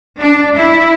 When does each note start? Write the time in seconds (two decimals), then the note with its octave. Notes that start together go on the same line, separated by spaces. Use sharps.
0.20 D4
0.56 E4